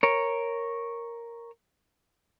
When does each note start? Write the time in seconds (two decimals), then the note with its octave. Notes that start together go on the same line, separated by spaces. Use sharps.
0.03 A#4 C#5